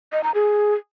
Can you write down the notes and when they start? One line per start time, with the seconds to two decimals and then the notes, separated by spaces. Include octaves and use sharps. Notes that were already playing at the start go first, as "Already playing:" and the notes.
0.13 D#5
0.24 A#5
0.35 G#4